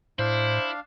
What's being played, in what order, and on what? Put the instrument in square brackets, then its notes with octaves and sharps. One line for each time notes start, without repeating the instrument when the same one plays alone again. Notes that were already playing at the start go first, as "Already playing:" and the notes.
[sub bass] A2 [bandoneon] D4 F5 [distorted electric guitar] E4 [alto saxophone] C5